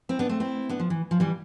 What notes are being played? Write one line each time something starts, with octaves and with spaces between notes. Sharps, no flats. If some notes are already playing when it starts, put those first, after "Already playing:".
C4 E4
B3 D4
A3 C4
C4 E4
B3 D4
F3
E3
F3
E3 G3